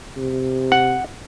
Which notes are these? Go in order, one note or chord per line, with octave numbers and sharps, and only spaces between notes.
C3
F#5